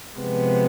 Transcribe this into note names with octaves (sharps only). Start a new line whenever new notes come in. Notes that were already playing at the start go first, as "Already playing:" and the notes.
C3 F3 G#3 B3